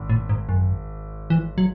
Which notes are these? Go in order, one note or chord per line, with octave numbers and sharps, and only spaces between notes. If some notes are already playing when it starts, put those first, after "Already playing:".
Already playing: G#1
A2
G#2
F#2
E3
F#3